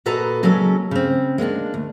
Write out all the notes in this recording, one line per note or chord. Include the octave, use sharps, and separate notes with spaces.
A#2 F#4 A4 B4 D#5 A#5
C#3 F#3 G#3 A#3 C#4 A4
C#3 C4
G#3 A#3 B3 D4
D2